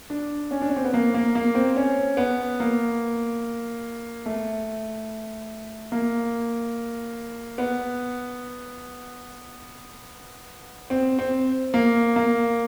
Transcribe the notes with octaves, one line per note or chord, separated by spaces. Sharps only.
D4
C#4
D4
C#4
C4
B3
A#3
A#3
A#3
C4
C#4
B3
A#3
A3
A#3
B3
C4
C4
A#3
A#3